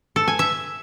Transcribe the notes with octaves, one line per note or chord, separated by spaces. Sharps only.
A4
G#5
E5